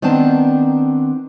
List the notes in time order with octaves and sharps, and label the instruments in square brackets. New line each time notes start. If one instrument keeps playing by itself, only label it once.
[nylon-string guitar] D#3 B3 C4 D4 A5